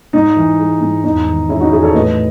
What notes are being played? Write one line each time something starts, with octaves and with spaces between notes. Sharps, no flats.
G#2 D#4
E3
G#3
G#2
E2 D#4
D#3
G#3 C#4 E4
D#4 F#4
E2 E4 G#4
A4 C#5
A2 B4 D#5